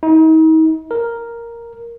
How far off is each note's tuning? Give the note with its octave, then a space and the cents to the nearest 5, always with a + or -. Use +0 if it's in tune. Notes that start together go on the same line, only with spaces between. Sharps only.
D#4 +40
A#4 +0